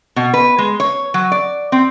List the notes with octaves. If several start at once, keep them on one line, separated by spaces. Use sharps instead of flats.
B2
B4
G#3
C#5
F#3
D5
C4